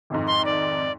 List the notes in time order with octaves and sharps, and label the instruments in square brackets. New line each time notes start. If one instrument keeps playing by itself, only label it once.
[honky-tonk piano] G#1 F2 G#2
[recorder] C6
D5